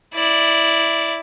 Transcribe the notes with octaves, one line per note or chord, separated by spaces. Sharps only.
E4 D5